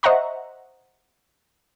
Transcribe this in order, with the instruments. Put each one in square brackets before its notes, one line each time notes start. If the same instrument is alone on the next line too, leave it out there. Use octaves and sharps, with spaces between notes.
[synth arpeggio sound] C5 D#5 E5 F#5 A#5 C#6